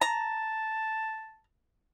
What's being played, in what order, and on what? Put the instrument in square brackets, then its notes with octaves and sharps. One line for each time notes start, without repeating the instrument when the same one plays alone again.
[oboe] A5 [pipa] A#5